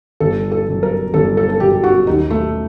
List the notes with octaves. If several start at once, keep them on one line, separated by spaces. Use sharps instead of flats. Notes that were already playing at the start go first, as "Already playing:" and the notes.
G1 A4
A4
F#2 F#3
A#4
G1 A4
A4
A4
F#2 F#3 G4
F#4
D#2 D#4
A3